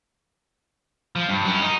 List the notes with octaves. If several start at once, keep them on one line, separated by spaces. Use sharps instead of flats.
F3
G2
F#3 C#4
D#4